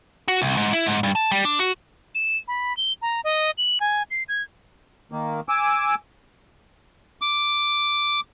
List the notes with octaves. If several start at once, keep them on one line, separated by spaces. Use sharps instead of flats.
F#4
C2
G#2
E4
G#2
G2
A5
G3
D4
F#4
E7
B5
G7
A#5
D#5
F#7
G#5
C7
G#6
D#3 A#3
G#5 D6 E6
D6